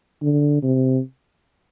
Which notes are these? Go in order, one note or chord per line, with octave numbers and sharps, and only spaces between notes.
D3
C3